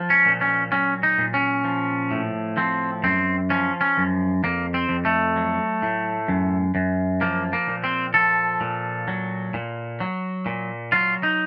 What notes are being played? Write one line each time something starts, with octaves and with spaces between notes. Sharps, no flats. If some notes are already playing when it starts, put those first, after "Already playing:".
Already playing: F3
C#4
A#2
C#4
F#3 C#4
D#4
A#2
C#4
F3
A2
F3 C4
F#2 C4
F3 C#4
C#4
F#2
F2 A#3
C4
F2
A3
F#3
A2
F#2
F#2
F3 A#3
A#3
A#2
C4
F3 A4
A#2
F#3
A#2
F#3
A#2
F#3 F4
D#4